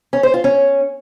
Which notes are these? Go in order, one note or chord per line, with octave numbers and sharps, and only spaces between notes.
C#4
C5
F4
C#4